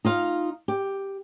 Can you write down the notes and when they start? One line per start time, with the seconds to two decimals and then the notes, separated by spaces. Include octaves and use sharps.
0.05 D#4 F4 F5
0.68 G4